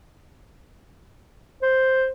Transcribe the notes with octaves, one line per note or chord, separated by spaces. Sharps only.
C5